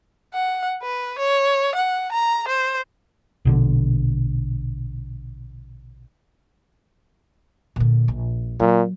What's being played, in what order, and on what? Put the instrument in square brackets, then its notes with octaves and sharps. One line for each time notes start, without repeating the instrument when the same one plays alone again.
[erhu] F#5
B4
C#5
F#5
A#5
C5
[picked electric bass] A#1 B2 D3
[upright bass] A#2 D3
A#1
[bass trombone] A#2 [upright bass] F#3